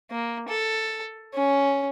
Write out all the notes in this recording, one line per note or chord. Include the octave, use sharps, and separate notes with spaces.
A#3
A4
C#4